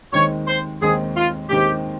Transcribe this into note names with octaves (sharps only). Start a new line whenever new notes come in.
D#2 D#3 G#3 C4 D#4 C#5
C5
D#2 D#3 G#3 C4 D#4 G#4
F4
D#2 D#3 G#3 C4 D#4 G4